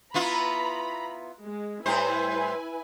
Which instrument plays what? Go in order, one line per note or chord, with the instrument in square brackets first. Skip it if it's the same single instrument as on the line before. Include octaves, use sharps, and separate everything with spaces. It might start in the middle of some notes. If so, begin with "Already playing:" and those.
[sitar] B3 E4 F4 [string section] A#5 B5
[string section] G#3
[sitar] A2 G3 C5 [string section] E4 B4 G#5